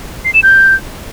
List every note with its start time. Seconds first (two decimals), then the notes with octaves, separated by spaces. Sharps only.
0.25 C7
0.34 E7
0.43 G6